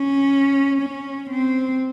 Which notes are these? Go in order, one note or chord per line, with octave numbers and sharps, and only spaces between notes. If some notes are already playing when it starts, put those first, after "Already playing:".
Already playing: C#4
C#4
C4